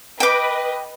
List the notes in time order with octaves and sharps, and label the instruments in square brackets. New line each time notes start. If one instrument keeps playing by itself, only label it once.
[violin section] B4 D#5 [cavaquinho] G5 D6